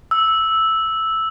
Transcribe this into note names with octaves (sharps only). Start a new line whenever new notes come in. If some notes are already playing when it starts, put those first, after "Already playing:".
E6